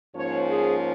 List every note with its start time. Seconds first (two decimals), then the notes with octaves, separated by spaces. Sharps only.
0.15 G#2 F3 A#3 C#4 C#5
0.49 G#4